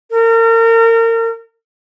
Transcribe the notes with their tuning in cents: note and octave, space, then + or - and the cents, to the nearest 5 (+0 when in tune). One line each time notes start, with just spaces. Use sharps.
A#4 -35